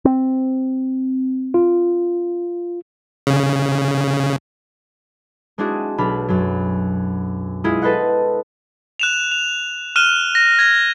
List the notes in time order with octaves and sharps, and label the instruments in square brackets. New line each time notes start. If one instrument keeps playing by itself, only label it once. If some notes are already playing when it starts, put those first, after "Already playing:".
[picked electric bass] C4
[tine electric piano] F4
[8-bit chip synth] C#3
[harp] G#3 C4 D4 E4 F#4 G#4
B1 D4 B5 F6
F#2 F#3
G#3 E4 F4 G#4
A4 B4 C5 D#5 F#5
[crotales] F#6 E7 F7
F7
F6 F#6 D#7 E7 G7
A#6
G#6 A#6